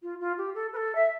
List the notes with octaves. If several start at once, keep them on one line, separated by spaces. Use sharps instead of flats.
F4
F4
G4
A4
B4
A4
E5